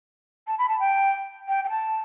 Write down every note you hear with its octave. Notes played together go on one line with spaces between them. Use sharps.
A5
B5
A5
G5
G5
G5
A5